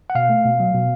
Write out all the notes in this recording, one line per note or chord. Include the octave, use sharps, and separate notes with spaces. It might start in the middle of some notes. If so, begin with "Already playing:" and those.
F#5
B2 F5
A3
B2
F#3
B2